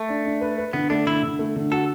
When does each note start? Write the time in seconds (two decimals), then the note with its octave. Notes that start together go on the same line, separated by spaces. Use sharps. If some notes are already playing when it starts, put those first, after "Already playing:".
Already playing: A3
0.09 D4
0.25 D4
0.41 B4
0.58 B4
0.73 D3 B3
0.90 A3 D4
1.06 D3 E4
1.23 D3
1.39 A3
1.56 D3
1.72 F#4 A4